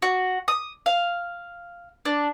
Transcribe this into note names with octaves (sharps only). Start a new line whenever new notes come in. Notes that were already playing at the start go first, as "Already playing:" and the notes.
F#4
D#6
F5
D4